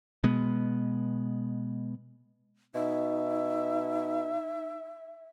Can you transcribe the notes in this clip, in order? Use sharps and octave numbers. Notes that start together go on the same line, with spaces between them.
B2 G#3 B3
B2 D#4 E5